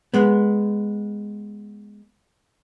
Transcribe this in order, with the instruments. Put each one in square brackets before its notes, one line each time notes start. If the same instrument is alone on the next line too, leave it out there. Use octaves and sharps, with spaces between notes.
[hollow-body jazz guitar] G#3 B3